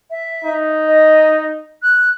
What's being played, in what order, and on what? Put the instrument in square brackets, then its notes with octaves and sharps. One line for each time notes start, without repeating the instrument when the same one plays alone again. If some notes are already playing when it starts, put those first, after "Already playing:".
[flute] E5
[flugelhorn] D#4
[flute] D#5
F#6